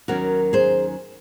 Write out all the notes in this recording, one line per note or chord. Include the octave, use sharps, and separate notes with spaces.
D#2 D#3 F#3 C#4 F#4 A#4
G#4 C5